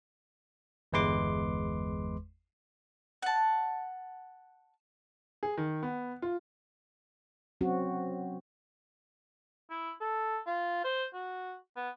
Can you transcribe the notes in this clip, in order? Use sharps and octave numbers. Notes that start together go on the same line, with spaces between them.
G1 E2 G#3 B4 C6 D6
F#5 A5
G#4
D#3
B3
F4
F#3 C4 C#4 F#4
E4
A4
F4
C5
F#4
B3